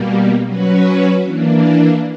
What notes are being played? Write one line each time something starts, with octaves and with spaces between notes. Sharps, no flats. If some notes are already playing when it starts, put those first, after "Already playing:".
Already playing: B2 G3 A#3
F#3 C#4 F#4 B4
E3 A#3 D4